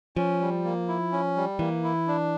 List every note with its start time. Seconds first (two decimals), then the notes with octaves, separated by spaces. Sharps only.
0.16 F3 C#4
0.41 G3
0.64 A#3
0.88 E4
1.12 C#4
1.36 G3
1.59 E3 A#3
1.84 E4
2.08 D4